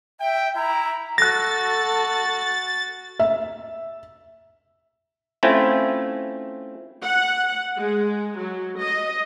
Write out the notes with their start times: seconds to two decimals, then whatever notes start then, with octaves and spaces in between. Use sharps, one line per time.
0.20 E5 G5
0.56 E4 A#5
1.18 F#4 A4 F#6 A6 A#6
3.19 E5
5.43 A3 C4 C#4 E4 F4
7.02 F#5
7.76 G#3
8.37 F#3
8.82 D#5